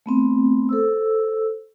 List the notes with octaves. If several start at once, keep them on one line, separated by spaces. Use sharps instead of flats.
A3 B3 C4
A4 C5 E6